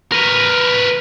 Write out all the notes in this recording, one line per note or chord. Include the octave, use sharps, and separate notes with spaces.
A#4 B4